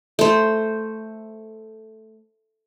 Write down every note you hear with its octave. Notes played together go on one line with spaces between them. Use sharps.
A3 C5